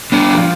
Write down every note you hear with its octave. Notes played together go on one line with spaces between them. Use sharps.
B3 D4
F3